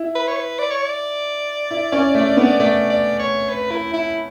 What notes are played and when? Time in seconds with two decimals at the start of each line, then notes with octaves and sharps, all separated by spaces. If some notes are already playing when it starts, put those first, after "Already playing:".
Already playing: E4
0.15 B4
0.28 C#5
0.37 B4
0.59 D5
0.71 C#5
0.82 D5
1.71 E4
1.92 C#4
2.15 A3
2.37 B3
2.60 A3 D5
2.90 D5
3.19 C#5
3.49 B4
3.71 E4
3.94 E4